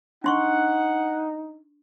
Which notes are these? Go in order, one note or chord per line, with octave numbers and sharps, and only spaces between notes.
D4 D#4 F#5 C6 C#6